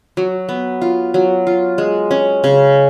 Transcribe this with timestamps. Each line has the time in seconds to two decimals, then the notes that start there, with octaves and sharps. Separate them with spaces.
0.17 F#3
0.49 B3
0.82 F4
1.14 F#3
1.47 F4
1.78 G#3
2.11 C#4
2.44 C#3